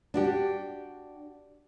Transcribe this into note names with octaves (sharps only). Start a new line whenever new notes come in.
D4 F#4 G4